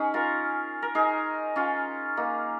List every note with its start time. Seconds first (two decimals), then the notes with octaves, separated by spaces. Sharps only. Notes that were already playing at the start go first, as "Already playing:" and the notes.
Already playing: C#4 D#4 G#4
0.14 F4 A#4
0.82 A#4
0.95 D#4 G#4
1.56 C#4 F4
2.17 A#3 D#4